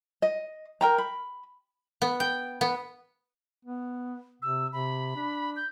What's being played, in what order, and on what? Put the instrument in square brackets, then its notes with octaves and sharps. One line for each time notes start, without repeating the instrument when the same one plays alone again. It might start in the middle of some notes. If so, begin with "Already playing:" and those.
[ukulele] D#5
A#4 G5 A#5
B5
[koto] B3
G5
B3
[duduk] B3
[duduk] C3 [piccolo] E6
[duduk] C3 [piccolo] B5
[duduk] D4
[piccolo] G6